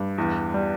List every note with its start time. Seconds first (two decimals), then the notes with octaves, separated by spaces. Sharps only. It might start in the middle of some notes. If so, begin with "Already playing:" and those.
Already playing: G2
0.18 E2
0.54 G3